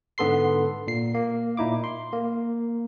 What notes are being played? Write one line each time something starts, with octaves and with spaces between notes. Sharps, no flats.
G#2 D3 B3 A4 C6 C7
A#2 C7
A#3
A#2 D#4 E4 D6
C6
A#3